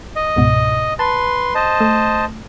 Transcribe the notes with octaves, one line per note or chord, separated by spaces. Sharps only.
D#5
C#2 G#2 B2
B4 A5 C6
C5 D#5 A5
A3